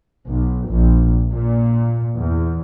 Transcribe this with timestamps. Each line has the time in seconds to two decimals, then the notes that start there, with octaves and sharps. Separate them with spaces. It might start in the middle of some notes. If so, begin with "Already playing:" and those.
0.28 B1
0.68 A#1
1.31 A#2
2.17 E2